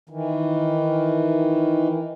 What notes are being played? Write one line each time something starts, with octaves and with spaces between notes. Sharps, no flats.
D#3 E3